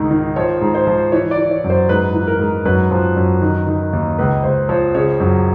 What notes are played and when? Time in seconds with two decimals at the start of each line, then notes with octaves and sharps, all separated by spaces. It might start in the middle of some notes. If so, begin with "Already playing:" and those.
Already playing: C#2 G#2 D#3
0.11 D#3
0.36 F3 C#5
0.61 G#2
0.75 C5
0.87 F3
1.12 E3 C#5
1.31 D5
1.38 E3
1.51 C#5
1.64 F#2
1.70 C5
1.89 G#2 B4
2.14 E3
2.27 A#4
2.40 G#2
2.65 F#2 B4
2.91 F3
3.16 F#2
3.42 D#3
3.67 D#3
3.93 D#2
4.18 C#2 B4
4.44 C#2 C5
4.69 F3 C#5
4.95 C#3 C#5
5.20 F#2